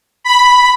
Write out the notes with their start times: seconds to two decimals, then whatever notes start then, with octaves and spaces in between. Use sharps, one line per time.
0.24 B5